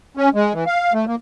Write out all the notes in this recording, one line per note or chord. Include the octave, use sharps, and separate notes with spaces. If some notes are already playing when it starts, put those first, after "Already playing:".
C#4
G#3
E3
F5
A3
A#3